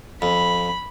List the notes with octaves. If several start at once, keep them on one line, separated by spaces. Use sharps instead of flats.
F2 B5